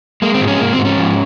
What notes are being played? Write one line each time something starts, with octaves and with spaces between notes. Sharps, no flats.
G#3 A#3
C4
G#2
C#4
G#2 A#3
C4
G#2
C#4
F3